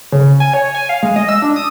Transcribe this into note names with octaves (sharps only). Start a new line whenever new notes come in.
C#3
G#5
C#5
G#5
F5
G#3
D#5
E6
D4
D#6